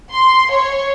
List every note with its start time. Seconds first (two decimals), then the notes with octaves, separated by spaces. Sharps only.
0.13 C6
0.53 C#5